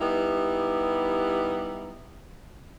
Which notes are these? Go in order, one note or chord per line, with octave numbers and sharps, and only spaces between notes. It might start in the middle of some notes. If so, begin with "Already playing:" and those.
G3 B3 D#4 E4 G4